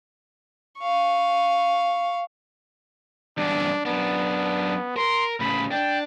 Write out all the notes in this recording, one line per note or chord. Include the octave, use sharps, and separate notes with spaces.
F5 C#6
E2 G2 D4
F#2 B3 D4
A#4 C6
A2 C#3 B5
D4 G5